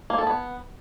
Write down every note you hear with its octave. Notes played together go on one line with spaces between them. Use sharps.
A#3
A4
B3